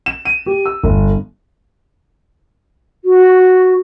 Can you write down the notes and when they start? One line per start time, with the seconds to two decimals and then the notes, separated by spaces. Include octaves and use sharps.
0.06 E7
0.25 D#7
0.46 G4
0.66 E6
0.83 G1
3.05 F#4